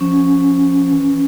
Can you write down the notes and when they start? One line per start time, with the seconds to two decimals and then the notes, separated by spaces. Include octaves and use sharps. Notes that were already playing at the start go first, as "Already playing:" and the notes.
0.01 F3 C#4
0.92 E3